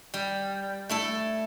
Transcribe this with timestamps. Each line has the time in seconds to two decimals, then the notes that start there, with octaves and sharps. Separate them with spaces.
0.14 G3
0.89 A3 E4 A4